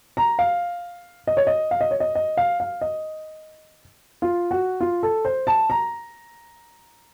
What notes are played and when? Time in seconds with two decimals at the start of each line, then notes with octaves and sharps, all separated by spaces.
0.17 A#5
0.39 F5
1.27 D#5
1.37 C#5
1.47 D#5
1.71 F5
1.81 D#5
1.91 C#5
2.00 D#5
2.15 D#5
2.37 F5
2.60 F5
2.81 D#5
4.22 F4
4.51 F#4
4.80 F4
5.03 A4
5.25 C5
5.47 A5
5.70 A#5